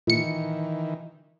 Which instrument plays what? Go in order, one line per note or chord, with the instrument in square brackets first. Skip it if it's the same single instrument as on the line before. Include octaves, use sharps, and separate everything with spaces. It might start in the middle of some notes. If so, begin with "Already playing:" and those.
[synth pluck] A#2 C#7 [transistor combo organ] D#3 E3